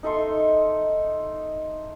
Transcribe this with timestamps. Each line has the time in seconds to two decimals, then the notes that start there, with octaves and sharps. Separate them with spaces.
0.03 D#4 A4 E5 C6